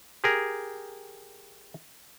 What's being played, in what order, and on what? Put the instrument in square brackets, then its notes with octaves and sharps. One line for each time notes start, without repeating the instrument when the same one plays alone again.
[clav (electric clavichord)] G4 G#4 A#4